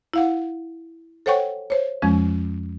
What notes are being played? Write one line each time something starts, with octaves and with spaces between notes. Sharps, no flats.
E4 F5 F#5
A4 C5 C#5 F#5 G5 C#6
C5 C#5
F2 F3 G#3 C#4